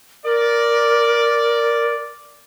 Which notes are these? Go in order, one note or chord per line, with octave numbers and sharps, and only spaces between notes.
A#4 D5